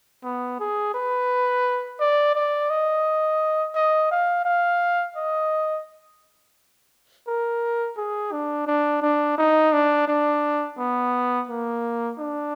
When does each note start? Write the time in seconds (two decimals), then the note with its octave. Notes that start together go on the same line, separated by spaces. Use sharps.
0.24 B3
0.59 G#4
0.94 B4
2.00 D5
2.35 D5
2.70 D#5
3.75 D#5
4.11 F5
4.45 F5
5.16 D#5
7.28 A#4
7.97 G#4
8.32 D4
8.67 D4
9.02 D4
9.38 D#4
9.73 D4
10.08 D4
10.78 B3
11.49 A#3
12.19 D4